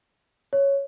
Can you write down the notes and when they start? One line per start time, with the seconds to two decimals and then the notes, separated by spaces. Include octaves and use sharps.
0.53 C#5